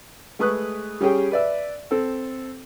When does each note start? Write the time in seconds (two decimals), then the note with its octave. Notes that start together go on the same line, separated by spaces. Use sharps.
0.39 G#3 A3 B4 C#6 D#6 F#6
1.01 G3 C#4 G4 G#4 G5
1.31 B4 D5 E5
1.91 C4 A4